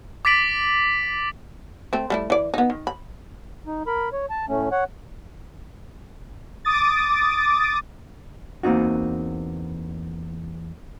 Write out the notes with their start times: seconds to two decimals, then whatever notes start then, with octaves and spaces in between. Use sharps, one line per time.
0.25 D6 A6 B6 D7 F#7
1.93 A3 C4
2.10 G3 A3 E4
2.30 E3 D5
2.54 B3 D#4
2.70 D#3
2.87 B5
3.67 D#4
3.87 A#4 B5
4.13 C#5
4.30 A5
4.49 A2 A3 C#4
4.72 C#5 F#5
6.65 D6 D#6 A6
8.63 E2 A#3 C4 D#4 F#4